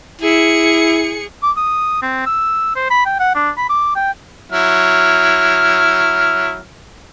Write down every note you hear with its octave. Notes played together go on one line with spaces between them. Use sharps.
E4 G#4 C#7
D6
D#6
C4
E6
C5
B5
G5
F#5
D4
B5
D6
G5
F#3 E4 F6